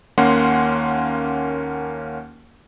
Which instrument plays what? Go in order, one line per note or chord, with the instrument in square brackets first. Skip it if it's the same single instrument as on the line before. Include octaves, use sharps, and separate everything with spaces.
[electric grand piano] D#2 A#3 C#4 F#5 C6